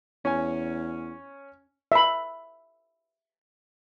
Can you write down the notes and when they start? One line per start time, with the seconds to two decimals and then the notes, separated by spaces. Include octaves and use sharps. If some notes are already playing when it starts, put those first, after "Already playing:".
0.25 E2 C#4 G#5
1.92 E5 B5